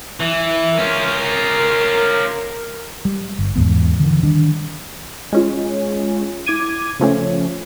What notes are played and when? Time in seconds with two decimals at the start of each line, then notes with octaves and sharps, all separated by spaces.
0.20 E3
0.78 C#4 F4 A#4
3.05 G3
3.39 G1
3.56 E2 G#2 E3 B3
4.00 D3 E3
4.23 D#3 G3 D4
5.33 G#3 C#4 F4
6.46 E4 D6 G#6 D#7
7.00 C#3 F3 A3 C#4